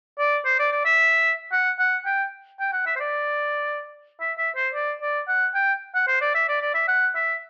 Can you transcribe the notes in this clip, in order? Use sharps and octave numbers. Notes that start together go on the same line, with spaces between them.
D5
C5
D5
D5
E5
F#5
F#5
G5
G5
F#5
E5
C5
D5
E5
E5
C5
D5
D5
F#5
G5
F#5
C5
D5
E5
D5
D5
E5
F#5
E5